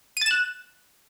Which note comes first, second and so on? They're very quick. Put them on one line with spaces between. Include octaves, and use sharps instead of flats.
D#7 A6 E7 F#6